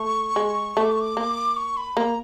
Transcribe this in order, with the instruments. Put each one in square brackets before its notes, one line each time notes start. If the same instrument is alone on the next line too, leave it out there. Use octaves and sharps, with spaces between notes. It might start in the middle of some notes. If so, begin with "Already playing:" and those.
Already playing: [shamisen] A3 [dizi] C#6
[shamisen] G#3
A3
[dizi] D6
C#6
D6
[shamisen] A#3
[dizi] C#6
B5
[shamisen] A#3 [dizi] A#5